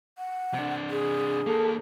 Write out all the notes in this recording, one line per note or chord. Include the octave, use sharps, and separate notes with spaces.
F#5
C3 D4
G#4
D#2 A#3 A4